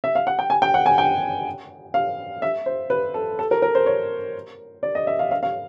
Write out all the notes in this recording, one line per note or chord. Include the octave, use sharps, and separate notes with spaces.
E5
F5
F#5
G5
G#5
G5
F#5
G#5
G5
F5
E5
C5
B4
A4
A4
A#4
A#4
C5
C#5
D5
D#5
E5
F5
F5
F5